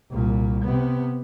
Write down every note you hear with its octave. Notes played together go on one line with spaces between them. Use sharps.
C2 A#2
C3 B3